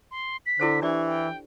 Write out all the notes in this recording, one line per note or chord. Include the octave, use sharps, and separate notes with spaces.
C6
B6
D3 E4 A4 C5
E3 D4 G4 D5 C#6
G5